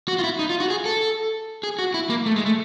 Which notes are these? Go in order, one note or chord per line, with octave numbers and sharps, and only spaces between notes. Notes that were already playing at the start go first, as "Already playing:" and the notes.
F#4
F4
E4
D#4
F4
F#4
G#4
A4
G#4
F#4
E4
A#3
A3
G#3
A3